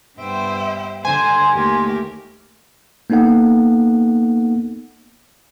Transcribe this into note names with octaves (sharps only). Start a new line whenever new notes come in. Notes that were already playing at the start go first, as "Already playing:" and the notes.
G2 B3 C5 E5 G5
D3 C5 G#5 C6
D#2 A3 G4 A#4
A#3 B3 D#4 A4 F#5